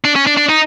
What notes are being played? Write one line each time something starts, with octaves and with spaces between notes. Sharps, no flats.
D4
C#4
D4
D4
D#4